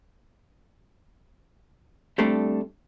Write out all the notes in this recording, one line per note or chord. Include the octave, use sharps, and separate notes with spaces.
G3 A3 C4 D4 A4